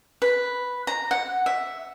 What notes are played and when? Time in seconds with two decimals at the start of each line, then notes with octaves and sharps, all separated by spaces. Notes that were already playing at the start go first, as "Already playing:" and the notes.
0.22 B4
0.87 A#5
1.11 F#5
1.46 E5